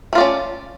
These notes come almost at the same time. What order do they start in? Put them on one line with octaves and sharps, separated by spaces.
A3 F4 D5 C#4